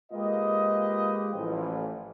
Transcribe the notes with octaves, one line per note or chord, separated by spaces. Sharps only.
G#3 A#3 F4 G4 B4 D#5
A1 E3 F3